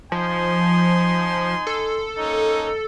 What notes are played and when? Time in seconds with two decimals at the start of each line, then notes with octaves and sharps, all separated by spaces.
0.12 F3 D#4 G#5 C6
1.67 A4
2.18 A#3 C#4 D#4